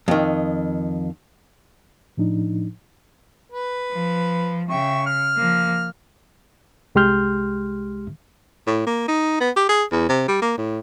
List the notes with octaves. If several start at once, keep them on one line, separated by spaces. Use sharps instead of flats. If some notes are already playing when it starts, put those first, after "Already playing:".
F2 D#3
A2 F3 D4 D#4
B4
F3
C#3 E5 G5 C#6
F6
F3 A#3
C2 G#3 G4 C6 F6 G6
A2
A#3
D#4
B3
G4
G#4
E2
C3
G3
A#3
A2